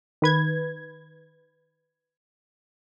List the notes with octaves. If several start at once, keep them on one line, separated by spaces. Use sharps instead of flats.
D#3 B4 G#6